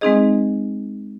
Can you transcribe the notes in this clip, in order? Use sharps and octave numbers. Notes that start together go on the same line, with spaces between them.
G#3 C4 D#4 G#4 D#5